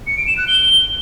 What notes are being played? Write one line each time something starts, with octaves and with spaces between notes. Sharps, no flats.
C#7
D7
E7
F#6
G7